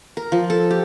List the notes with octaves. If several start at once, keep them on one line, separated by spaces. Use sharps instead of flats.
A#4
F3
A4
G4